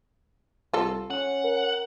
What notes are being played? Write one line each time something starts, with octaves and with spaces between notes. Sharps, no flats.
C2 F4 A4
C#4 F#5
A#4